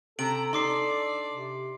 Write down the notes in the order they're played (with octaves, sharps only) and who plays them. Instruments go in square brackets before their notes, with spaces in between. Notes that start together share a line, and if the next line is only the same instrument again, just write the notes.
[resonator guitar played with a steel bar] C3 [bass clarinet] A4 [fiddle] E5 A#5 [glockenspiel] D7 F#7
[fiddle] D4 D5 [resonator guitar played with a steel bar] D#4 [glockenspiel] C6 D6 C7
[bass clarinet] C3